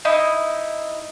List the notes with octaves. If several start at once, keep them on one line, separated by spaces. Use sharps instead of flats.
D#4 E4